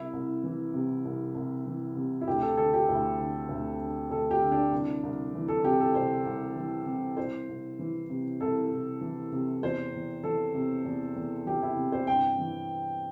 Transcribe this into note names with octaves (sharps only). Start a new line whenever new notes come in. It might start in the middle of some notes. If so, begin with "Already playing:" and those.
Already playing: C2 E4
C2
E3
C3
C2
C2
E3
C3
E4
D2 G4
A4
D3 A4
G4
D2 E4
D3
D2
D3
D2 A4
G4
D3
D4
C2
C2
E3
A4
C3 G4
A4
C2 C5
C2
E3
C3
C2 C5
C2
E3
C3
C2 A4
C2
E3
C3
E2 C5
E2
E3 A4
C3
E2
E2
E3 G4
E4
C3
C5
G2 G5
E3